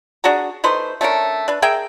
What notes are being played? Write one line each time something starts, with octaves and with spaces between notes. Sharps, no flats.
D4 F#4 G#4 A#5
A3 D#4 B4 C5
A3 C#4 D4 A#4
D4 B4
G#4 A#4 E5 G5